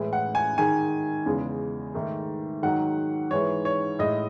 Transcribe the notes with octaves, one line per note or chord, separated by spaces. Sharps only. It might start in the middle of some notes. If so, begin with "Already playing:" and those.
Already playing: A2 E3 G#3
F#5
G#5
G#2 D#3 G#3 G#5
E2 C#3 G#3
G#2 D#3 A3
G#2 D#3 F#3 F#5
G#2 E3 G#3 C#5
C#5
A2 G#3 D#5